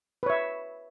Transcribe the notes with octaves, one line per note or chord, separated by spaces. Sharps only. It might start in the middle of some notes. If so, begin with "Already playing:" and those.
B4 C#5 E5